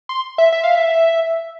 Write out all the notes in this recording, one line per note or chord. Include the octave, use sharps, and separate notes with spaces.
C6
E5
E5
F5
E5